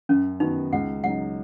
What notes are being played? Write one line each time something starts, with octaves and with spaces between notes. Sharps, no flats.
F#2 C#4
D#3 B3 D#4 F#4
C#2 F#5
C#3 F#3 D#4 F#5